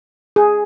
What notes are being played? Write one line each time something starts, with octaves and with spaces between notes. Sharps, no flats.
G#4